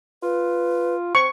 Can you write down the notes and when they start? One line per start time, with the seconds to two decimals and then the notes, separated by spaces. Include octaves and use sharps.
0.23 F4 B4
1.15 C4 C#6